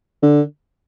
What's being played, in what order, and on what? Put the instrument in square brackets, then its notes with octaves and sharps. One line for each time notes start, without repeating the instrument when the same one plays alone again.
[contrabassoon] D3